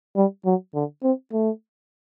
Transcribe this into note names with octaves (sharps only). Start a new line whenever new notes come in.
G3
F#3
D3
C4
A3